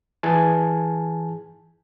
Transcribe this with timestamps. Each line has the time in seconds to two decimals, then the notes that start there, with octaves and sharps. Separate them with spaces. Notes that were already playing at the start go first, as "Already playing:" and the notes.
0.23 E3 G#4 G#5 A5